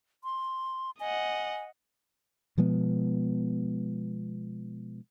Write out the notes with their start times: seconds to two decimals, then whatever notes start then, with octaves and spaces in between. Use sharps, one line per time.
0.24 C6
1.00 D#5 F#5 G#5
2.58 B2 F3 G#3 B3